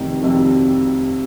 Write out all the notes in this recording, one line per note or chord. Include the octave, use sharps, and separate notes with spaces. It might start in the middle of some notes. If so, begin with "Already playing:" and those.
Already playing: F1 F2 C3 D#3
F1 F2 C3 D#3